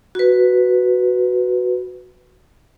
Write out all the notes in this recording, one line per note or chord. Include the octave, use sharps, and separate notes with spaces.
F#4 B4